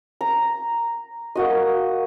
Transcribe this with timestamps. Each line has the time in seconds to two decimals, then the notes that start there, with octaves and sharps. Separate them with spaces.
0.21 A#5
1.35 A#3 F#4 D#5